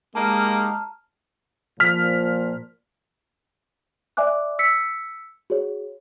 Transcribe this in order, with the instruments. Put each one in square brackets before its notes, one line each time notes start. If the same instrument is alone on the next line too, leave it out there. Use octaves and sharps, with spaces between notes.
[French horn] G#3 [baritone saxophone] A#3 [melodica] D#4 G4 F5 [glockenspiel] A5 A#5 F6
[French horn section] A#2 F3 [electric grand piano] F6 B6
[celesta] D5 E5 G#5 D6 F#6
E6 B6 C#7
F#4 G#4 C#5